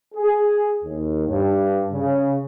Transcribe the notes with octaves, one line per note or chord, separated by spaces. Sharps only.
G#4
D#2
G2
C#3